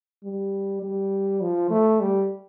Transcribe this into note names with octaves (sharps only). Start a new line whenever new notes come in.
G3
G3
F3
A3
G3